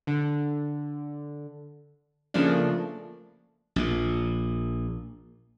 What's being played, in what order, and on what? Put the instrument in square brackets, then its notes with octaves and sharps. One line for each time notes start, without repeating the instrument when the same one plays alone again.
[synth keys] D3
C#3 F3 A3 A#3 D4
[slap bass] A#1 A#2